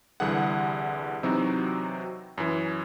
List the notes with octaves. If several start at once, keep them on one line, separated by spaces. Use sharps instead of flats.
C2 D3 E3 G3 G#4 F#5
C3 E3 F#3 C4 D#4 F#4
F#2 E3